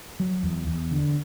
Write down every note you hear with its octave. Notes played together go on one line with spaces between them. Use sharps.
F#3
E2
E2
D3